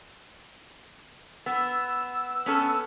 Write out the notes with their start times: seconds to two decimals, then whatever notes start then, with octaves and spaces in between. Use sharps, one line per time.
1.46 B3 E6
2.46 B3 C#4 A4